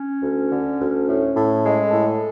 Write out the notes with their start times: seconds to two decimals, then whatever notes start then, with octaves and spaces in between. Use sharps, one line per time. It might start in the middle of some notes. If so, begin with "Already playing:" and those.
Already playing: C#4
0.22 D2
0.50 D3
0.79 D2
1.07 A2
1.35 A2
1.63 G#3
1.90 A2 A4